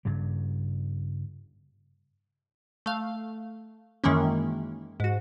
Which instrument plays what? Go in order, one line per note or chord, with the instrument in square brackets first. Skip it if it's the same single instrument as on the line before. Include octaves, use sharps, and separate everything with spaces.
[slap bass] G2 C#3 G3
[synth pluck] A3 F5
F#2 D#3 E3 G#3 A#3 C#4
G#2 F#4